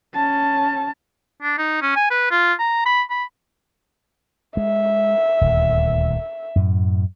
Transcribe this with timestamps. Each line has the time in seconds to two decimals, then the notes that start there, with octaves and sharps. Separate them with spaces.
0.14 C#4 A5
1.42 D4
1.58 D#4
1.82 C#4
1.96 G#5
2.10 B4
2.31 F4
2.59 A#5
2.86 B5
3.10 B5
4.57 G#3 E5
5.41 D#1 D2
6.56 F#2 A2